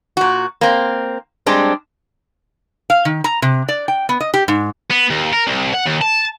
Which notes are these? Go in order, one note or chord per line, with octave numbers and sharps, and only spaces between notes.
A#2 F#4
A#3 C4
G3 G#3 C4 D4
F5
D#3
A#5
C3
D5
G5
B3
D#5
G4
G#2
B3
D#2
A#4
C2
F#5
D#2
A5